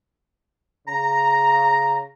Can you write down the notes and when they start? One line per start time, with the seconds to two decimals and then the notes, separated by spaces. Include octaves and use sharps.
0.88 C#3 A#5